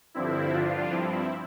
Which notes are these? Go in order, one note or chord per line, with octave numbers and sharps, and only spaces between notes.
G2 D3 F3 C4 E4
G2 D3 F3 D4 F4
G2 F3 C4 E4